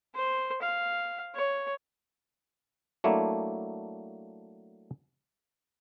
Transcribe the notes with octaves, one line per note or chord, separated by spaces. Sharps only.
C5
F5
C#5
F#3 A3 A#3 D4 E4